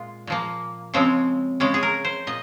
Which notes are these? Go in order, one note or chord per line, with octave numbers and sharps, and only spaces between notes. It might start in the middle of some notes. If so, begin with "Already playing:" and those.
Already playing: A#2 G#3 F4
A#2 F3 A#3
C#3 F3 G#3 C4
C#3 G#3 C#4
G#4
A#4
C5
A#2 D#5